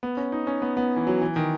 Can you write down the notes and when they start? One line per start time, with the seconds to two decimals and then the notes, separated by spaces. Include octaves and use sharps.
0.03 B3
0.17 C#4
0.32 D#4
0.47 C#4
0.62 B3
0.77 B3
0.96 E3
1.07 F#3
1.21 E3
1.36 D#3